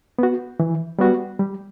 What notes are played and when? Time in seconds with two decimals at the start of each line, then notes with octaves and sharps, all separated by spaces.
0.19 B3 F#4
0.60 E3
0.99 G3 B3 F#4
1.39 G3